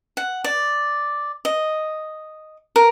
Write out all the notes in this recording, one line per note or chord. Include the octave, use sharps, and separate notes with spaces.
F#5
D5
D#5
A#4